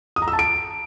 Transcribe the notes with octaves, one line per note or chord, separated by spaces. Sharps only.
D#6
A#5
E6
A5
D7